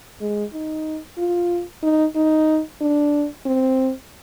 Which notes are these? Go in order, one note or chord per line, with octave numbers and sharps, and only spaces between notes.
G#3
D#4
F4
D#4
D#4
D4
C4